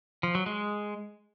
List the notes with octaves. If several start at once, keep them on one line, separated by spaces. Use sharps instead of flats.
F3
F#3
G#3